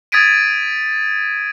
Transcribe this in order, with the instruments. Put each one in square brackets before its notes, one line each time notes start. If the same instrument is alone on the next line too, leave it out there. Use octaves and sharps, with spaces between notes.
[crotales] D#6 G#6 A6 B6 D7 D#7